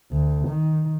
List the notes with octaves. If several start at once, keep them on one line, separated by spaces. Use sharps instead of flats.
D2
D#3